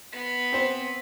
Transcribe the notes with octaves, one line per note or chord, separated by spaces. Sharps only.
B3 B5
C4 C5